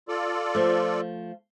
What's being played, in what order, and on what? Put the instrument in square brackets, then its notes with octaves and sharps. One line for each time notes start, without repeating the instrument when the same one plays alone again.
[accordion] F4 A4 D5
[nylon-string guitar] F3 A3